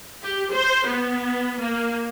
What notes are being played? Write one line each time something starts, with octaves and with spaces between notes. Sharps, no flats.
G4
C5
B3
A#3